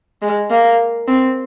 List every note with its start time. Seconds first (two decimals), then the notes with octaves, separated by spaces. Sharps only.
0.22 G#3
0.50 A#3
1.08 C4